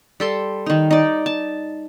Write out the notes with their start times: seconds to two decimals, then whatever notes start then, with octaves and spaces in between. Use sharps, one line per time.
0.20 G3 A4 C6
0.66 D#3 D#4
0.91 D#4 D5
1.26 A5